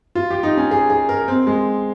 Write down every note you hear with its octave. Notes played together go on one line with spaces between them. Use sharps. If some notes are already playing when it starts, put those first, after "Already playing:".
F4
G4
D#4
C#4
G#4
G#4
A#4
C4
G#3